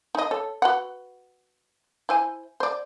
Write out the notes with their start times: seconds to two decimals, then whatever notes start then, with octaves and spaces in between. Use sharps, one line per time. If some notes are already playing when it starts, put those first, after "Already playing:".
0.15 D#4 D#5
0.31 A4 C#5
0.62 F#4 B4 F#5
2.09 E4 C5 G#5
2.60 C5 D5